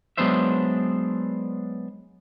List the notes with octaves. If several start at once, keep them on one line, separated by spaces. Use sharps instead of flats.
F#3 G#3 B3 D4 C5 E5